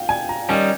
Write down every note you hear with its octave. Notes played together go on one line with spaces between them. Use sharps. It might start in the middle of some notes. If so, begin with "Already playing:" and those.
Already playing: F5 G5
G#5
A#5
D#3 G3 C#4 G#5